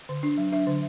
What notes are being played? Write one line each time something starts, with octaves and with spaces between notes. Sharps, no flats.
D3
D4
F#3
D4 E5
D3